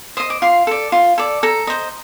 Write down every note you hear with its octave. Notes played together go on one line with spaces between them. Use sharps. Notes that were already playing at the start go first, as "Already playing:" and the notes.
C5 D#5 D#6
D6
F4 C6
A4 D5
F4
A4 D5
A4 A#5
C5 D#5